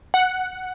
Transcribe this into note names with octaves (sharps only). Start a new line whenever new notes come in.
F#5